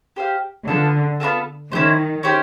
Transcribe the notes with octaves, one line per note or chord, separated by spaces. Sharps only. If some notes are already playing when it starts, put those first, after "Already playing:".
G4 C5 F5
D3 B3 D4 F4 A4
B3 D4 F4 A4
D#3 C#4 E4 G4 C5
C#4 E4 G4 C5